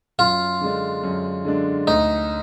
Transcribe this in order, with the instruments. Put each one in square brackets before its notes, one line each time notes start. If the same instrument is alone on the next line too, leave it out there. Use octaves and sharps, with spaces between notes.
[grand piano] F#2 [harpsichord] F4
[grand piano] D3 G#3 D4
F#2
D3 G#3 D4
[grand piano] D2 [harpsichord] D#4